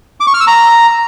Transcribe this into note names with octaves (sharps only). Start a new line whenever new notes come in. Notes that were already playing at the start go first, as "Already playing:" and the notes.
D6
C#6
F6
E6
A#5